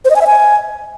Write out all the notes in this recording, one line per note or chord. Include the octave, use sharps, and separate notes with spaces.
C5
D#5
G#5
E5
G#5